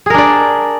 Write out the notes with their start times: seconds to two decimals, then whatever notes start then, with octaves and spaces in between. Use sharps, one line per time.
0.06 G#4
0.10 A#4
0.14 D4
0.18 D5